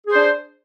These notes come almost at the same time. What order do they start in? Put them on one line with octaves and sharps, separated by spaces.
G#4 C5 D4